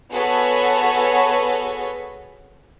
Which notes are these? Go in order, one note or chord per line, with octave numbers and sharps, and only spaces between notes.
B3 F#4 G#4 A4 B4 C#5